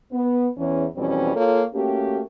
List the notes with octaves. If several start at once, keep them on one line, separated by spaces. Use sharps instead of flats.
B3
E2 E3 C#4
F2 B2 E3 G3 C4 C#4
A#3 F4 A4 C#5
A3 A#3 C#4 F#4 G4